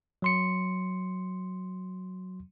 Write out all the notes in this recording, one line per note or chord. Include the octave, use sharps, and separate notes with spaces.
F#3 C6 C#7